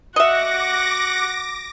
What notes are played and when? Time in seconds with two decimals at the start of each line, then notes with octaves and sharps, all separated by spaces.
0.16 F#4 D#5 E5 F#5 D6 A#6